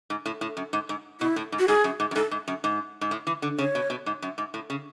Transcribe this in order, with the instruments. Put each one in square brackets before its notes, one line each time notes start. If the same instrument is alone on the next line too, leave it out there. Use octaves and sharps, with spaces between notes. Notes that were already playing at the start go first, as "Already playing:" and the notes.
[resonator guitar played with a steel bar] G#2
A2
A2
F#2
G#2
G#2
[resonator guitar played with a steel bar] B2 [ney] E4
[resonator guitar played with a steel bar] A2
G#2
[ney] F#4
[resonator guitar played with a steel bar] G#2 [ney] G#4
[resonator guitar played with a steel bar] F#2
G#2
F#2
[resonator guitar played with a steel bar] G#2 [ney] A4
[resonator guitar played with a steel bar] G#2
F#2
G#2
G#2
A2
E3
D3
[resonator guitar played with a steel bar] C#3 [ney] C#5
[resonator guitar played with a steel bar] B2
B2
G#2
F#2
G#2
A2
C#3